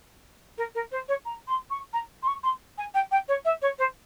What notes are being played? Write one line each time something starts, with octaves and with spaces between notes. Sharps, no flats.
A#4
A#4
C5
C#5
A#5
C6
C#6
A#5
C6
C#6
C6
G#5
G5
G5
C#5
E5
C#5
C5